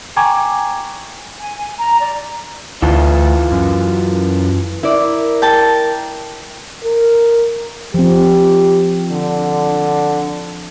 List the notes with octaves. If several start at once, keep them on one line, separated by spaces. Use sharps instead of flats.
G5 G#5 A#5 C#6 D6 G#6
G#5
G#5
A#5
D5
D2 E3 F4 A4
F#2
E4 A#4 D5
G5 A5
A#4
F3 C4 G4
D3